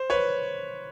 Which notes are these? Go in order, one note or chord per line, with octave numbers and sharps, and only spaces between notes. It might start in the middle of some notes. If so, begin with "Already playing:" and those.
Already playing: C5
B4 C#5